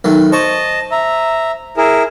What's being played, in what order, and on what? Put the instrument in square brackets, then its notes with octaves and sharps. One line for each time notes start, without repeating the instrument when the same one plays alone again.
[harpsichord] B1 D#3 A3
[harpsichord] C5 C#6 [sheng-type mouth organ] D#5 A5
[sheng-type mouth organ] E5 A#5
E4 G#4 A#4